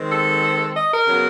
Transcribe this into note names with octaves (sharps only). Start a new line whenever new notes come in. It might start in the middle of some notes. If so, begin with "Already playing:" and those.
Already playing: D#3 G#3 C4
A4
D#5
A#4
C#3 F#3 B3